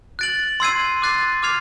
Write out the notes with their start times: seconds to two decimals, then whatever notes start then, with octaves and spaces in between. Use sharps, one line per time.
0.19 F#6 A6 D7 F#7
0.60 C6 E6 G#6 C7 D#7
1.02 D6 F#6 A6 C7
1.43 D6 F6 G#6 C7 F7